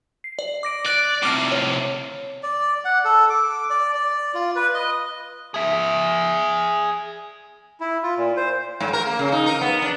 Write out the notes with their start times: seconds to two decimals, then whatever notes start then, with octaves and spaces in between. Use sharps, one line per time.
0.24 C7
0.39 D5
0.63 D6 A#6 D7
0.86 D5 F#6 A6
1.23 A2 C3 D6 F6 C7
1.52 C#5
2.43 D5
2.85 F#5
3.05 A4
3.30 D6
3.70 D5
3.95 D5
4.34 F4
4.56 B4
4.74 D#5
5.54 G#4 E5
7.80 E4
8.03 F4
8.17 A#2
8.37 C5
8.80 G#2
8.93 A#4
9.07 A#3
9.19 C#3
9.32 D#4
9.46 A#4
9.61 B3
9.82 D4